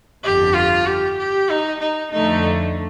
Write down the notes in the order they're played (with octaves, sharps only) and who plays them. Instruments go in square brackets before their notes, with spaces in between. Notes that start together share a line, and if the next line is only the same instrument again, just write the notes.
[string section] G1 F2 D3 [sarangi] G4
[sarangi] F4
G4
G4
D#4
D#4
[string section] F2 D3 A3 [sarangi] D#4